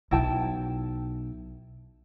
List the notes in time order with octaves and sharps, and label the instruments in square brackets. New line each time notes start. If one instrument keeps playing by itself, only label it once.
[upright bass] B1 [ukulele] E4 G5 A5